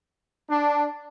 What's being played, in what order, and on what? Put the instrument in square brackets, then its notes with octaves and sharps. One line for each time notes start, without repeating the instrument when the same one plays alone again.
[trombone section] D4